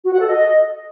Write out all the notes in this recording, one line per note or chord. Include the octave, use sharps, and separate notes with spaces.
F#4
F#5
A4
D#5